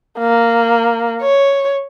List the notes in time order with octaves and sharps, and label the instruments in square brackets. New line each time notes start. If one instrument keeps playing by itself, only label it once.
[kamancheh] A#3
C#5